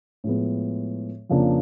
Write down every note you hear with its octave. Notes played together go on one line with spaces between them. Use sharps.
A2 F3 G#3 B3
F2 C#3 F3 A#3 D4